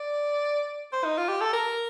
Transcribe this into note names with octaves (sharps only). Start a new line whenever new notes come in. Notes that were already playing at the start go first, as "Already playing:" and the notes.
Already playing: D5
C5
D#4
F4
G4
A4
A#4